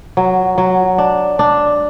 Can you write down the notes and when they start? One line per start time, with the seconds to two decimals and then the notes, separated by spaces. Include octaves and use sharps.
0.17 F#3
0.58 F#3
0.98 D4
1.39 D4